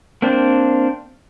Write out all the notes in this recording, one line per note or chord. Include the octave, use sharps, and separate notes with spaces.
A#3 C4 D4 C5